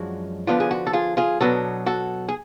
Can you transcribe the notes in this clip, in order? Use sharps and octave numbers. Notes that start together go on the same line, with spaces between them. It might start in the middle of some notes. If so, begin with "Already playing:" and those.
Already playing: F#2 F3 G#3 D4 F#4
D3 F3 B3 D4 F4
G#4
F#4
A4
F4 G#4
F4 G#4
B2 F#3 B3 D4 F#4 A4
F#4 A4
G#4